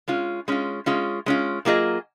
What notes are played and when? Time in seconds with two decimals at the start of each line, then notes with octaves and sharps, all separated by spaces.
0.08 G#3 C#4 F4
0.48 G#3 C#4 F4
0.86 G#3 C#4 F4
1.26 G#3 C#4 F4
1.65 F#3 A#3 F4 G#4 D#5